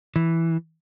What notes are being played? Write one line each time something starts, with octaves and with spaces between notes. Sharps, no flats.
E3